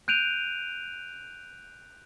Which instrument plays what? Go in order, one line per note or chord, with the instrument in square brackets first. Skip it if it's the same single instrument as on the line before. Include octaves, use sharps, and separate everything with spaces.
[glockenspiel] F#6 G6 D7 D#7 F7